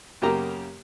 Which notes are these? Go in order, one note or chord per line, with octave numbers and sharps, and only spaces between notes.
F#2 C#3 A#3 G4 A#5